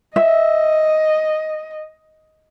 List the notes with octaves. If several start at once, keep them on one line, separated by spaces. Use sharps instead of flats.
D#5 E5